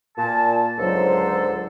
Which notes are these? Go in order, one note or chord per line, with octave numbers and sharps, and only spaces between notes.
A#2 A5
C#2 G#2 D3 F#3 A4 C5